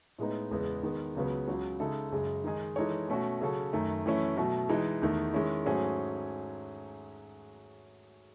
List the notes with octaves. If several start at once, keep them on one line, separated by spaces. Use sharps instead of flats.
A2 G#3 B3 D#4
E2 C#3 G#3 B3
D#3 G#3 B3
C#2 C#3 F#3 B3
C#2 C#3 F#3
C#3 G#3 D#4 A4 E5
F#2 C#3 G#3
D#3 G#3 D#4 G#4
E3 G#3 D#4 A4 C#5
B2 A3 C#4 F#4
C#3 F#3 C#4 F#4 A4
F#2 D#3 A3
F#2 E3 A3 C#4 E4
B2 F#3 A3
E3 G#3 D#4
E2 D#3 A3
D#3 G#3 C#4 E4
G#2 F#3 A3 C#4 G#4